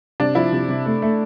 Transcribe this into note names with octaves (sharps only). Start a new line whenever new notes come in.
C3 D4
F3 E4
C3
C3
A3
A3